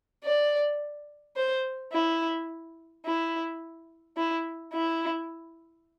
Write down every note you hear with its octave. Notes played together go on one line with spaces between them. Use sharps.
D5
C5
E4
E4
E4
E4